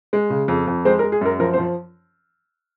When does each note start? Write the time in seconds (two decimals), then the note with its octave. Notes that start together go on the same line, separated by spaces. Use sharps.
0.13 G#3
0.30 C#3
0.48 F2
0.67 F2
0.85 G#3 C4 C5
0.99 A#4
1.03 G#3
1.12 G#4
1.21 F#2 A#4
1.40 F3 A#4
1.53 C4 C5
1.58 F3